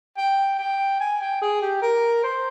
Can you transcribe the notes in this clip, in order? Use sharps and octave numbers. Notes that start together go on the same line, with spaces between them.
G5
G5
G#5
G5
G#4
G4
A#4
C5